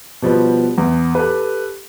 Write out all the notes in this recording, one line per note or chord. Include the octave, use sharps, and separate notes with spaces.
B2 F3 G3 B3
E2
G4 A4 B4